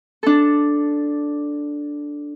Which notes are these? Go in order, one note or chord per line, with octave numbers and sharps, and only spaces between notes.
D4 A4